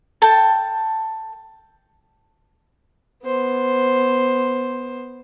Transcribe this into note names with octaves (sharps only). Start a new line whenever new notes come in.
A4 G5 A5
B3 C5